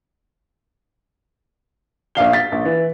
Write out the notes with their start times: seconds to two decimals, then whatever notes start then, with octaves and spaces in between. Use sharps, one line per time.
2.15 A#1 D5 F5 G7
2.33 A6 B6
2.52 A#1
2.65 E3